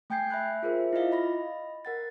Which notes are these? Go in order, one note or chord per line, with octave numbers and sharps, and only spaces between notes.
A3 G5 G#5 G6 G#6 C7
E5 B5 F#6
F4 G#4 A#4 C5 E5
E4 F4 D5 D#5 F5
D#5 B5 A#6
A#4 F#5 A6